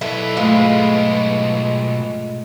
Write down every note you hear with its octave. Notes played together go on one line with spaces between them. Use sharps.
B1 E4 A4 B4
G#2 G#3 A3 F4